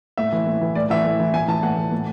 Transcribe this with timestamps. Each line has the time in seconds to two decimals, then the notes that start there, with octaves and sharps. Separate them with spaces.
0.18 A2 E5
0.33 E3
0.47 A2
0.61 E3
0.75 A2 D5
0.90 E3 E5
1.05 A2
1.20 E3
1.34 A2 G#5
1.48 E3 A5
1.63 A2 F#5
1.77 E3
1.92 A2